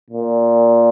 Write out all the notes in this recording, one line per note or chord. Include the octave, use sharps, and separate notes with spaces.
A#2